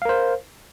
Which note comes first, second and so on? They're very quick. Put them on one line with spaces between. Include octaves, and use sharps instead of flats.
F5 A#4 C5